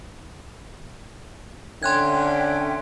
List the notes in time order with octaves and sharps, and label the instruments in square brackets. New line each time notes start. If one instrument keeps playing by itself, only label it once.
[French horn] D3 [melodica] C#4 [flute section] E5 G5 [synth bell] C6 F#6 G#6